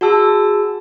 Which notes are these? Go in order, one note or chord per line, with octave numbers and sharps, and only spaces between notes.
F#4 G#4 A5 E6